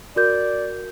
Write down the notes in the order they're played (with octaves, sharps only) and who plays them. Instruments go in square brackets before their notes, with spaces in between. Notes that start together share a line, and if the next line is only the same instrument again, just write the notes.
[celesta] F#4 A#4 G6 [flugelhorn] D5